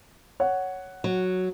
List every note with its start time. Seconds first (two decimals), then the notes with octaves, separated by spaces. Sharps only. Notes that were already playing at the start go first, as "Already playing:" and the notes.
0.40 C#5 F#5
1.04 F#3